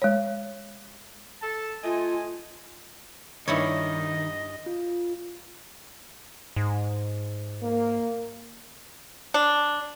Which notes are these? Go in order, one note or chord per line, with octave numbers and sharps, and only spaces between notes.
G#3 C#5
A4 A5
A3 F4 D#5 G#5
G2 D#3 E4 C#5 D#5
F4
G#2
A#3
D4